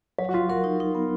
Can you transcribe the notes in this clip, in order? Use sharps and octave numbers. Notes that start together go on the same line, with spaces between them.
F#3 C#5
F#4
F#3 F4
F#4 A#4
D#4
D#4
B3